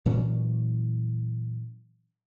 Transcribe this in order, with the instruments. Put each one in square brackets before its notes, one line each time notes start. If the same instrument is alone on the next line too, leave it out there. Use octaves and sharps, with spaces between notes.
[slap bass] A#2 E3 F#3 C#4